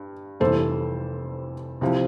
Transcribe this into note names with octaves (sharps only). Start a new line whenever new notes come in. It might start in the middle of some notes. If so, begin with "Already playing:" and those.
Already playing: G2
F1 F2 E3 G3 A4 C5
C2 C3 F3